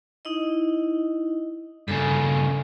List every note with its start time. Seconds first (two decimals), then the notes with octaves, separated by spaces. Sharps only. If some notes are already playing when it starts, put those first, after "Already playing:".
0.25 D#4 E4 D#5
1.88 G2 C#3 A4 G#5